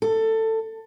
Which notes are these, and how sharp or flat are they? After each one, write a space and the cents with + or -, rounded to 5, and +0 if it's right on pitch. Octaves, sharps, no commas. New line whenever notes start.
A4 +20